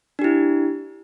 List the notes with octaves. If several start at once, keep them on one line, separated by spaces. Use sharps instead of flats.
D4 E4 G4